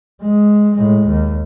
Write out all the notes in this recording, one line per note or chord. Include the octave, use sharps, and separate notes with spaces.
G#3
A2 G#3
D#2